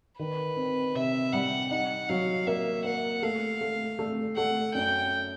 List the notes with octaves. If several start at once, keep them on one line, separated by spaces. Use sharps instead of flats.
D#3 B4
C4
C3 E5
G3 F#5
D#4 F#5
F#3 F5
A#3 E5
A#3 F#5
A3 F5
A3
A3
A3 F#5
F#2 G5